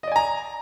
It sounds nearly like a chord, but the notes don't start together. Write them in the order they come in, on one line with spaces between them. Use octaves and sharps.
D#5 D5 G#5 A#5